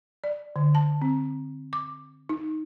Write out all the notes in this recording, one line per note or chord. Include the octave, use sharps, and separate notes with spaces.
D5
D3
A5
C4
D6
D#4